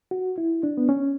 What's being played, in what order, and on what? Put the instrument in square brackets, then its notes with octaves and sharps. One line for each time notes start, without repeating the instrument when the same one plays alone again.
[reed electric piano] F#4
E4
D4
B3
C#4